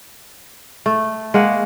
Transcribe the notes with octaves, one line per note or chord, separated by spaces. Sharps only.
A3
G#3 A#3 F#5